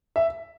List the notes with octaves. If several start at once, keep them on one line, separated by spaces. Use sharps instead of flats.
E5